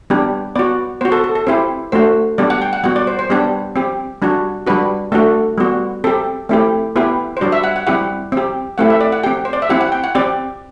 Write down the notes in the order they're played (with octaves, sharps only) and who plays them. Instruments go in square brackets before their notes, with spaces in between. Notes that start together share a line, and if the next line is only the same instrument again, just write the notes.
[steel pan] G3 B3 D4 G4
B3 F#4 D5
B3 F#4 C5
A4
A4
A4
C4 E4 G4 C5
A3 D4 F#4 C5
G3 B3 D4 G4 D5
F#5
G5
F#5
G3 B3 F#4 F#5
D5
C5
C5
G3 B3 D4 G4
C4 G4
G3 D4 F#4
G3 D4 F#4 B4
A3 D4 F#4 A4
G3 B3 F#4
C4 G4 A4
A3 C4 E4 G4
B3 E4 G4 B4
C5
G3 D4 F#4 D5
E5
F#5
F#5
G3 C4 E4 G4 F#5
C4 G4
A3 C4 E4 G4 F#5
E5
D5
F#5
C4 G4 G5
C5
D5
E5
C4 E4 G4 F#5
F#5
G5
F#5
C4 G4 D5